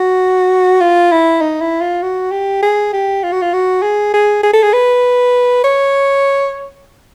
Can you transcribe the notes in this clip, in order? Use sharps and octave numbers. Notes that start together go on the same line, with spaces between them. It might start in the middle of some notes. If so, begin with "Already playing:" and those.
Already playing: F#4
F4
E4
D#4
E4
F4
F#4
G4
G#4
G4
F4
F#4
F4
F#4
G#4
G#4
G#4
A4
G#4
B4
C#5